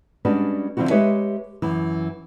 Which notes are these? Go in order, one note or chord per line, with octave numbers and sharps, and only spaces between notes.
G3 G#3 C#4 D4 F#4 B4
D3 F3 C4 E4 F#4
G#3 G4 B4 C#5 E5 G#5
F#2 E3